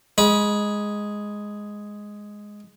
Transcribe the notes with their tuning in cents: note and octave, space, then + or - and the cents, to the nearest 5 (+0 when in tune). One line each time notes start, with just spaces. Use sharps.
G#3 +0 B5 -30